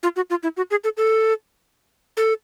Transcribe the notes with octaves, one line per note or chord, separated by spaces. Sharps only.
F4
F#4
F4
E4
F#4
G#4
A4
A4
A4